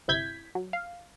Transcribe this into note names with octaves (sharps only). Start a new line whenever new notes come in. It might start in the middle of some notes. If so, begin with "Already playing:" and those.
G1 C3 E4 G6 G#6 B6
F#3
F5